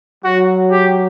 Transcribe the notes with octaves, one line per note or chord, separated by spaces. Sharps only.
F#3 F#4
G4